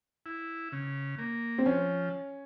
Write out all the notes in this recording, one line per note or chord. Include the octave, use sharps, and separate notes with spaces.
E4
C#3
A#3
C4
F3 C#4